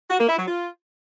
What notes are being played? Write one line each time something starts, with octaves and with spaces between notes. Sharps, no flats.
F#4
A#3
E4
F#3
F4